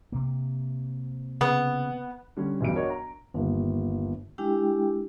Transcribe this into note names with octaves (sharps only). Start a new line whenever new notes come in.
C3 A#3
C#3 B3
D3 G3 C#4
E1 B1 G2 D7
D4 F#4 A#4 C#5 D#5
A#5
G1 D#2
G#3 D4 E4 G4 G5